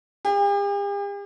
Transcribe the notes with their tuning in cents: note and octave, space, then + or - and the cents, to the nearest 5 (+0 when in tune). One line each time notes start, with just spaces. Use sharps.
G4 +45